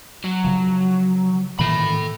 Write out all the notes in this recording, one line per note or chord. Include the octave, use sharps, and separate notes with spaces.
F#3
C#3 F3
A#2 D#3 E3 A4 B5